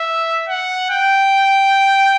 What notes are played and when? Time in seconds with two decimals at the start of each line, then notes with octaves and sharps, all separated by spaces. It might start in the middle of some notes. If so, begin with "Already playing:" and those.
Already playing: E5
0.49 F#5
0.90 G5